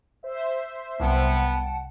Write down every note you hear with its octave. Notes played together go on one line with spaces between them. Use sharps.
C5 E5
C2 F#3 B3 F#5 G5 A5